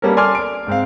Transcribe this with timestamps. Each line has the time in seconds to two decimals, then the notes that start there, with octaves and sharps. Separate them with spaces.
0.02 G3 A#3 B3 C#4 A4 A#4
0.16 A4 D5 G#5 C6 D6 F6
0.35 D7
0.67 G#2 C4 F5